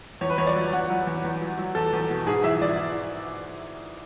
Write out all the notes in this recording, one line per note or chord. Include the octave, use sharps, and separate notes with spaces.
E2 C#5
B4
E2 C#5
D5
F#3
E2 F#5
F#3
E2
E2
F#3
F#3
E2 A4
E2
B2
G#2 G#4
E3 E5
E3 D5